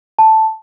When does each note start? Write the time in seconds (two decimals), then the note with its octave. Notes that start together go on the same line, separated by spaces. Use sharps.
0.19 A5